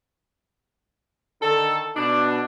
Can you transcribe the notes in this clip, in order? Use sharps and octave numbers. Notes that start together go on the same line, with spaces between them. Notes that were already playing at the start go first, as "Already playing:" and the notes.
D3 D#3 A4
B2 D4